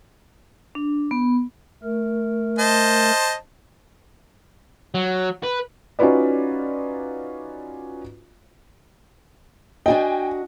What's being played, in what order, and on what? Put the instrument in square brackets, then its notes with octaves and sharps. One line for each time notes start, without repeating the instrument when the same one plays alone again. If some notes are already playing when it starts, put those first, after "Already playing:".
[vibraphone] D4
B3
[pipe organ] A3 A#4
[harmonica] C5 D#5 A5
[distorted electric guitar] F#3
B4
[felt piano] C#4 D#4 F4 F#4 B4 D5
[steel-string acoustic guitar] D4 F#4 D#5 [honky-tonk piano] G5 G#5